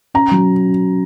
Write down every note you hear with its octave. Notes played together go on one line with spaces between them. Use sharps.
C#4 A#5
F#3